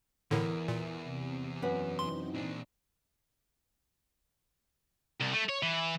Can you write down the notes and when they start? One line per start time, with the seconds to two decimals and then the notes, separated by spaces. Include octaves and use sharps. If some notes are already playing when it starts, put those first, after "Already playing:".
0.31 E2 A2 D3 E3 E4 A#4
0.68 A#2
1.03 C3
1.62 F#2 B4 F#5
1.99 E3 C4 D#4 C6
2.34 A#2 D4
5.20 C2
5.33 A3
5.49 C#5
5.63 E3